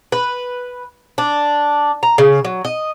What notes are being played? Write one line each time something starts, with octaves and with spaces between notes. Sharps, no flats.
B4
D4
A#5
C#3
F#3
D#5